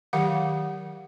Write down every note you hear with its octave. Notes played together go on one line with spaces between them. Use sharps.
D#3 F#3 G4 F5 F#5